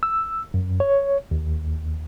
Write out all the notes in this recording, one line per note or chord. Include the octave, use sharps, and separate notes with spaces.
E6
F#2
C#5
D#2